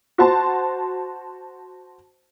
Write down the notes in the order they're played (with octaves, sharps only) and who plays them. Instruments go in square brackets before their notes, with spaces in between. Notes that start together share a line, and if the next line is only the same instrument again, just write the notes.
[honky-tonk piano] F#4 C5 A5 C6